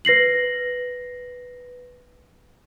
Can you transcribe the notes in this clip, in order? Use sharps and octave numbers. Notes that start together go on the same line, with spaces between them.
B4 A#6 C7 F#7